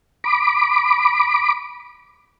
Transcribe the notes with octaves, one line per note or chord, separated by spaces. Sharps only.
B5 D6